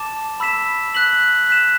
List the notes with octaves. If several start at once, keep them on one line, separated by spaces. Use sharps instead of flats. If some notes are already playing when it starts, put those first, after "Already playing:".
Already playing: A5 D6 A6 E7
B5 E6 B6 E7
F#6 B6 F#7
F#6 B6 E7